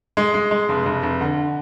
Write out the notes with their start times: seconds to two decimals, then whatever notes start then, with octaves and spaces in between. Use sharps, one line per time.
0.17 G#3
0.34 G#3
0.51 G#3
0.69 F1
0.86 F1
1.03 F1
1.21 D3